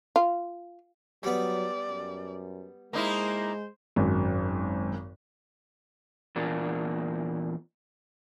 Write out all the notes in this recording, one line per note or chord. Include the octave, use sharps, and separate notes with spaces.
F4
F#3 G3 B3 D5
F#2
G#3 A#3 D#4 E4 C5
G#1 F#2
E2 A#2 A#3 D4